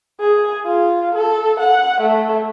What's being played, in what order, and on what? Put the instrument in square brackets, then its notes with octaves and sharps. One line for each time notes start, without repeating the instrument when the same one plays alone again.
[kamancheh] G#4
F4
A4
F#5
A3